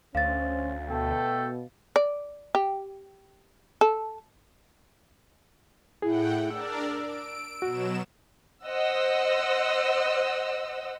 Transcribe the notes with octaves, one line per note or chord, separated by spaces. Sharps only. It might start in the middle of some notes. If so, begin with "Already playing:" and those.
D2 C#4 C5 F5 A6
B2 A3 A4 G5
D5
G4
A4
A2 E4 G#4 F#5 G5
D4 A#4 D5 E6
D7
B2 F#3 F#4 E7
C5 D#5 F#5 E6